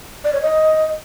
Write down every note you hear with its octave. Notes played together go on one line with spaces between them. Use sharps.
D5
C#5
D#5